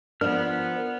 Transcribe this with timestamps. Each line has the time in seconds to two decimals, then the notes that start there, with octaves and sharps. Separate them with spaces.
0.21 F3 B3 D4 A#4 F6